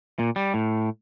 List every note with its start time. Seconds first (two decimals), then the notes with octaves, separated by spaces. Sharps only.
0.19 A#2
0.36 G3
0.54 A2